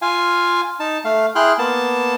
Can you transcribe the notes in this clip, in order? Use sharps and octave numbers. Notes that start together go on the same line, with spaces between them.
F4 F5 G#5
D#4 A5
A3 F5
E4 G#4 G5 C6 F6 F#6
A#3 B3 A5